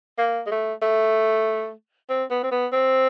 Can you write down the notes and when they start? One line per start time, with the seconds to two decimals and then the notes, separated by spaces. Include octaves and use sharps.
0.18 A#3
0.46 G#3
0.51 A3
0.82 A3
2.09 C4
2.30 B3
2.43 C4
2.52 B3
2.73 C4